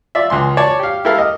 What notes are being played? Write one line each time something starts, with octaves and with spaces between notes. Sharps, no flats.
F4 D5 E5
C#2 G#3 C6
C#5 D5 A5
G4 F5
E4 G4 A4 A#4 F5
D#5